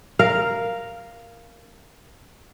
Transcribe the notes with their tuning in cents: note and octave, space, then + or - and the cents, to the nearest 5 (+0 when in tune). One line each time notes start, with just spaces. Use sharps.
A#4 +0 F5 -5